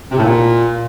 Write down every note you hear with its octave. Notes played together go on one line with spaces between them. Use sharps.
C3
A2
A#2